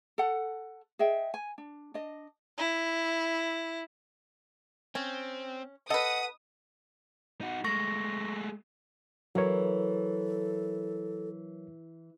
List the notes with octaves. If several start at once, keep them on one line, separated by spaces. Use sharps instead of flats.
A4 F#5
G#4 D#5 E5 G5
G#5
D4
D4 D#5
E4
C4 C#4
A4 B4 D#5 F#5 D#6
D#4 F#4
G#3 A3 C#6 A#6
E3 F#3 A4 A#4 C#5